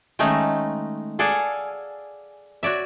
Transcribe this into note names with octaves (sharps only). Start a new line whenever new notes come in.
D#3 G#3 A3 C#4 D#4
G#4 A4 D5 F5 F#5 G#5
F#4 C#5 D5 E5